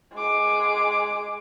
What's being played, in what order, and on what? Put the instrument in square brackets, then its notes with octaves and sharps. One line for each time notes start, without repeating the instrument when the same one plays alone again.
[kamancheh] G#3 D6